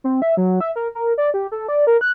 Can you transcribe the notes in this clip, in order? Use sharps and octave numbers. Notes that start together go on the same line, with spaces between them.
C4
E5
F#3
E5
A#4
A#4
D5
G4
A4
D5
A#4
F#6